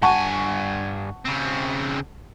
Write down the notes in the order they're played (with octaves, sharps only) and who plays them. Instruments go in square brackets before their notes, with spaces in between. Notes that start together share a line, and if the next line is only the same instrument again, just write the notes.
[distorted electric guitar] G2 G#5 [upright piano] F#5 A5 C#6
[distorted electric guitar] C#3 C4